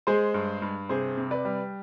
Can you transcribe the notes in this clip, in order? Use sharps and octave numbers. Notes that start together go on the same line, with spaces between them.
G#3 G#4 C5
G2
G2
C3 G#4 C5
C3
B4 D5
G3